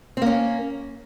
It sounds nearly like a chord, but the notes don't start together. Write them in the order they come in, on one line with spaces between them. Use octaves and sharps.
C4 A#3 C#4